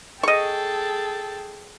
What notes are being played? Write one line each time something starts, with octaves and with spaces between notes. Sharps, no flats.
G#4 A4 D#5 G5 C#6